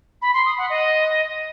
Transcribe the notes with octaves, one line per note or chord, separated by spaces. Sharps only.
B5
C6
D#6
F#5
D#5